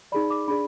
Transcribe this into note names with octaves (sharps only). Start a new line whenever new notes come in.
D#4 G#4 D5 B5
D6
D4 G#4 D5 B5